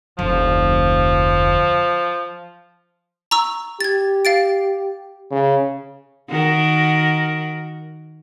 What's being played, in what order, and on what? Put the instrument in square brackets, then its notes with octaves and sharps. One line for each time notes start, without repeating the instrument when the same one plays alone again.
[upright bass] F1 D2 [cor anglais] F3
[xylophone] A#5 C#6 E6
[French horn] G4 [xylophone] G#6 A6
[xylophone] F5 A6 D7
[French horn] C#3
[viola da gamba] D#3 F#4 A#4